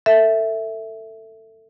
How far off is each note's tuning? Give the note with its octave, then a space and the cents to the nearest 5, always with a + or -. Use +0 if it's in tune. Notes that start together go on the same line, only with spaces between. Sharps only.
A4 +25 E5 +0